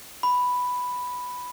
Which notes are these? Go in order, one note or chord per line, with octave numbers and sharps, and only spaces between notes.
B5